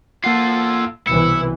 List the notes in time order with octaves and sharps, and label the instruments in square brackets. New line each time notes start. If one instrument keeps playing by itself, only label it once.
[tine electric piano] A#3 F#5 C7 [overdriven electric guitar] F4 A4
[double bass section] C2 B2 E3 [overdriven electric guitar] E4 [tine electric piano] C#7